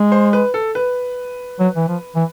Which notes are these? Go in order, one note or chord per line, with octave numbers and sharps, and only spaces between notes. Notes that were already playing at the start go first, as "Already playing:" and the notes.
Already playing: G#3
C5
B4
A4
B4
F#3
E3
F3
E3